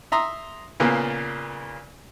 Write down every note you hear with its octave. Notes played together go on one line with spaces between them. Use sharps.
E5 A#5 C6 D#6
A#2 C#3 A#3 B3